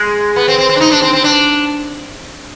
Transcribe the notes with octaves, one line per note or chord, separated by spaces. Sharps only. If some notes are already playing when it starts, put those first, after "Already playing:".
Already playing: G#3
B3
C4
C4
C4
D4
D#4
D4
C4
C4
D4